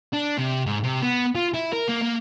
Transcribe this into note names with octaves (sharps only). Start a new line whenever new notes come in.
D4
C3
G#2
C3
B3
F4
E4
A#4
A#3
A#3